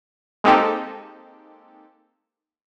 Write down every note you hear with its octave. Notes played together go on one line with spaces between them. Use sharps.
G#3 A#3 C4 D#4 G4 A4